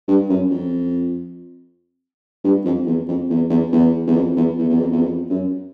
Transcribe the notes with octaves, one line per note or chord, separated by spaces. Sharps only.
G2
F#2
F2
G2
F2
E2
F2
E2
E2
E2
E2
F2
E2
E2
E2
F2
E2
F2
F#2